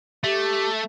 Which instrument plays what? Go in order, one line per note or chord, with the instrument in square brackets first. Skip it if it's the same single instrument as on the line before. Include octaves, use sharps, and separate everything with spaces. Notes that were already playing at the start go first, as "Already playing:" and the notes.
[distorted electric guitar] A3 [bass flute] G4